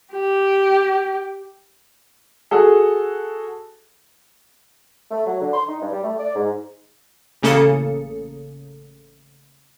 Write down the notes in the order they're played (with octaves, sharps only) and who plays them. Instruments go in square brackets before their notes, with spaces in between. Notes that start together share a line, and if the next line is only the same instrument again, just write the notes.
[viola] G4
[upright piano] F#4 G#4 A4
[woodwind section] A3
F#3
D3
C6
D#4
G2
G3
A3
D5
G#2
[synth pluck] A1 C#3 A#3 A4 D#6 C#7